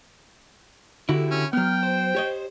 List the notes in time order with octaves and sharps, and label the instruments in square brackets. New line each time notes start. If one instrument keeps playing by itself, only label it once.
[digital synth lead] D3 [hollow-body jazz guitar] E4 F#4 G4
[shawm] C#4
[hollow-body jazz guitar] F#3 B3 [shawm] G5 [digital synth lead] F6
[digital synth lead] C5
[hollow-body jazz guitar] G4 C#5 D#5